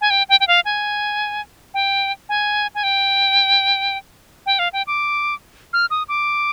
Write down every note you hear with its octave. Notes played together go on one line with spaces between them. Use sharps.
G#5
G5
G5
G5
F5
G#5
G5
G#5
G#5
G5
G5
F5
G5
D6
F6
D#6
D6